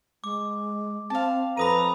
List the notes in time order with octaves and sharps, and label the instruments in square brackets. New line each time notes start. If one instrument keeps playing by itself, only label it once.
[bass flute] G#3 [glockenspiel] D6
[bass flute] C4 [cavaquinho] F5 A5
[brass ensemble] F2 A4 A#5 [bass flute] B4 [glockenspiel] B5 D#6 D#7